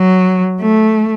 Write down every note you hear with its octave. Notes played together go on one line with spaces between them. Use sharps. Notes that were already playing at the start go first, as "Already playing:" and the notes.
Already playing: F#3
A3